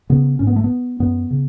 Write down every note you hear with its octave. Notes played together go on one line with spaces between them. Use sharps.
C#3 B3
G#2 C#4
B3
A3
B3
F#2 B3
C#3